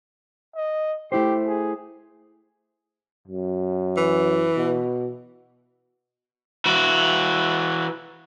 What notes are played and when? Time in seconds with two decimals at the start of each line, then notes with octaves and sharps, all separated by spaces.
0.56 D#5
1.12 A3 E4 G4 C5
1.47 G#4
3.28 F#2
3.97 E3
4.56 B2
6.66 E3 F#4